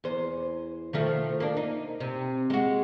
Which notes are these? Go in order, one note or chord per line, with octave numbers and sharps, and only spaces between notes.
E2 C5
D#3 F3 A3
A#3 D4
D#4
C3
G#3 F#4